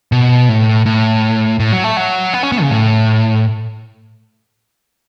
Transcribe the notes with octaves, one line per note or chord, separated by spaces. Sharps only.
B2
A2
A2
A2
F#3
A3
F#3
B3
C#4
B3
C#3
A2